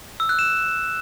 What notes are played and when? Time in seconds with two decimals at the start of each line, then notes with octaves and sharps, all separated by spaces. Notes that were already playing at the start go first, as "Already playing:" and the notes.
0.20 E6
0.29 F#6
0.39 E7